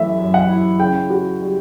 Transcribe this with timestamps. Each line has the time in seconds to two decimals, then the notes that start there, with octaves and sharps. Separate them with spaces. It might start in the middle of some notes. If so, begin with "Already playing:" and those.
Already playing: F#2 E3 A3 E5
0.18 F#2
0.34 F#5
0.49 E4
0.79 C#3 G5
1.10 F#4
1.41 G3